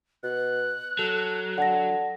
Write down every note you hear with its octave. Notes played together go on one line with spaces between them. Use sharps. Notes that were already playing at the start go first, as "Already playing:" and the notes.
B2 F#6
F#3 A4
D3 F#5 A5 A#6